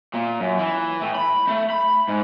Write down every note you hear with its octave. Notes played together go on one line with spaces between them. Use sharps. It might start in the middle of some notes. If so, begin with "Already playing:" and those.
A#2
F#2
E3
A2
B5
A3
B5
G#2